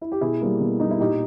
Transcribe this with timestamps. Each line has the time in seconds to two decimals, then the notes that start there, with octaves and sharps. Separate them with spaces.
0.01 E4
0.12 G4
0.21 B2 E4 G#4
0.41 G3 A#3
0.60 B2
0.80 G3 A#3 D#4
0.91 E4
1.00 A#2 D#4 G4